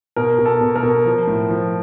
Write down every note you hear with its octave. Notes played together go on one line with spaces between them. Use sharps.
B2 A#4
B2
A4
B2
A#4
B2
F3
A2
F3